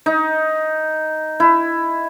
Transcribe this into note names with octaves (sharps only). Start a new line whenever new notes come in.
D#4
E4